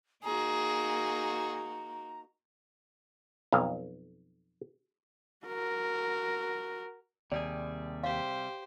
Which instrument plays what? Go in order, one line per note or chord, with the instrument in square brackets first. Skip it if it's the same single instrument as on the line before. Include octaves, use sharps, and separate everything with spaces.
[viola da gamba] A#3 D#4 F#4 [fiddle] G#4 [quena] A#5
[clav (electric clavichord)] B1 F2 F5
[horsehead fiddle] F#4 A#4
[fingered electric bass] D#2 [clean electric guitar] C3 G3 G#4 [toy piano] D5
[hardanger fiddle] G4 C5 [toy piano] F5